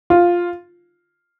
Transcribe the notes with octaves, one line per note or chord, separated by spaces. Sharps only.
F4